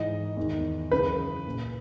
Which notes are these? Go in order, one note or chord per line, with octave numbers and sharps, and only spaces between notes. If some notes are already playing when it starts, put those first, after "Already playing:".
Already playing: G#2 E3 D#5
E2 D#3
F#2 C#3 E3 B4
A#2